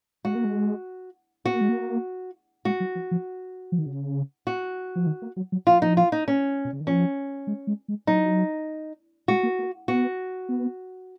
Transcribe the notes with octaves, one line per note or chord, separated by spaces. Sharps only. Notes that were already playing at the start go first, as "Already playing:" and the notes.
G#3 F#4
A#3
G#3
B3 F#4
A#3
G#3
A#3
G#3 F#4
F#3
F3
F3
F3
D#3
C#3
F#4
F3
D#3
A#3
F#3
F#3
F3 F4
D#4
F4
D#4
C#4
B2
C#3
D#3
F3 C#4
G#3
G#3
G#3
F#3 D#4
G#3 F#4
A#3
A#3
B3 F#4
B3